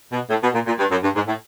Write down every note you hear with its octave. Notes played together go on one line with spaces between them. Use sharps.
B2
A2
B2
A#2
A#2
G2
F#2
G2
G#2
A2